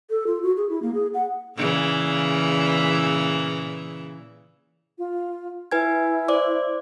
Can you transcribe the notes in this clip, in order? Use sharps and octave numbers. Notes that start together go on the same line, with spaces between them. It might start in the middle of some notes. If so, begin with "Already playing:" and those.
A4
F4
F#4
G#4
E4
A#3
G#4
F#5
A#2 C#3 E3
F4
E4 B4 G#5 G#6
C5 D5 D6